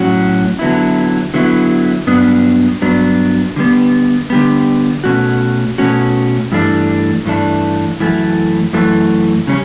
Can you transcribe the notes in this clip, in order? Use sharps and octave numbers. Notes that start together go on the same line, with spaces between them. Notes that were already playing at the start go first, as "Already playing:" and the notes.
Already playing: A2 F#3 C#4 F#4
D3 F#3 B3 E4
D3 F#3 B3 E4
G2 F#3 B3 D4
G2 F#3 B3 D4
D3 G3 B3
D3 G3 B3
B2 A3 C#4 F#4
B2 A3 C#4 F#4
G2 E3 A3 D4
G2 E3 A3 D4
F#2 E3 A3
F#2 E3 A3
C#3 G3 C#4